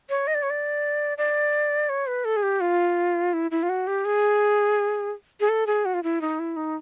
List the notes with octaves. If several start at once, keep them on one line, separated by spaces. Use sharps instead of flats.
C#5
D#5
D5
C#5
D5
D5
C#5
B4
A4
G#4
G4
F4
E4
E4
F4
F#4
G4
G#4
G#4
A4
G#4
F#4
F4
E4
D#4
E4
D#4